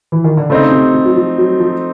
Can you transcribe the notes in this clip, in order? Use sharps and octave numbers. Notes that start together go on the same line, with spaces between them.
E3
D#3
D3
C#3 A3 C4 D#4
C3
C3
F#3
F3
F#3
F3